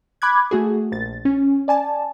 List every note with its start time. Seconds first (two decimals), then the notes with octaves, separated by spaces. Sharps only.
0.22 B5 D6 F#6 G#6
0.51 A3 F#4 G#4
0.92 A#1 A6
1.25 C#4
1.68 D5 G#5 A5